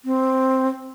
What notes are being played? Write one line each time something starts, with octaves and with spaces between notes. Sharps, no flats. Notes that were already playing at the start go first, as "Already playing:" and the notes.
C4